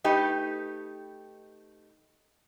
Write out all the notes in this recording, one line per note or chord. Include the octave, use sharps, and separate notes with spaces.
A3 D#4 G4 B4